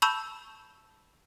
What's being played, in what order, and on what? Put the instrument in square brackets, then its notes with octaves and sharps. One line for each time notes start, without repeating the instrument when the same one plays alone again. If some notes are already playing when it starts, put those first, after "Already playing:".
[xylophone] A5 B5 C#6 E6 G6 E7